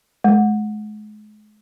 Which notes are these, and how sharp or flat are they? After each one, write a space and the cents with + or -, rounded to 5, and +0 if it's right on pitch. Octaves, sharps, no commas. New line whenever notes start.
G#3 +35